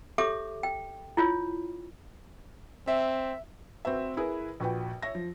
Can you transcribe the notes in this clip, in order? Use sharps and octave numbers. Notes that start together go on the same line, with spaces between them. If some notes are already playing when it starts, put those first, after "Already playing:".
G4 A4 C#5 E5 D6
G5
E4 F4 C#5
C4 E5
C4 F#4 B4 E5
E4 G#4 A#4 B4
A#1 F#4 B4 G5
C#5 E5 A#6
F3